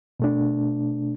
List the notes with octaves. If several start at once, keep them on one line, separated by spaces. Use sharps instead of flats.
B2 A3 D4